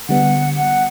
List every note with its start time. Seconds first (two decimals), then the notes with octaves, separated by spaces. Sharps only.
0.09 D3 G3 B3 F#5
0.57 F#5